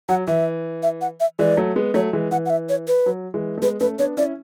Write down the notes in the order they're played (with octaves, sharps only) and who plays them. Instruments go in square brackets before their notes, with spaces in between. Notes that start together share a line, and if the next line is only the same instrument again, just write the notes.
[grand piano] F#3 [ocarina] F#5
[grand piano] E3 [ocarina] E5
[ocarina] E5
F#5
E5
[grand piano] E3 G#3 [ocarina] D5
[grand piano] F#3 A3
G#3 B3
[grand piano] F#3 A3 [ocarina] C#5
[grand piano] E3 G#3
[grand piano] E3 [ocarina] F#5
[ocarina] F#5
E5
C#5
B4
[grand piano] F#3
E3 G#3
A3
[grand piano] G#3 B3 [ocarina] B4
[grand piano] A3 C#4 [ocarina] B4
[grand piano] B3 D4 [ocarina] C#5
[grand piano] C#4 E4 [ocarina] D5